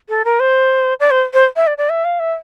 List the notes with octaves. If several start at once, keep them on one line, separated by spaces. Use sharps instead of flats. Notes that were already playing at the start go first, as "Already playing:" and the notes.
A4
A#4
C5
D5
C5
C5
E5
D5
D5
E5
F5
E5